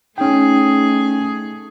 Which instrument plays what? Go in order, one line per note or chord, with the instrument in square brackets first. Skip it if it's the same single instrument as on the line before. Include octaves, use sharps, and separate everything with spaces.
[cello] A3 [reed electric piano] C#4 G5 [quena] D#4 [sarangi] G#4